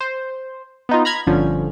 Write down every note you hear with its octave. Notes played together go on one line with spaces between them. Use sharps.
C5
B3 D#4 F4
A#5 B5 F6 G#6
G1 D3 F3 C#4